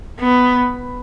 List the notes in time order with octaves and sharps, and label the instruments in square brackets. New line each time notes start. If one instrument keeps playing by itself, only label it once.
[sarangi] B3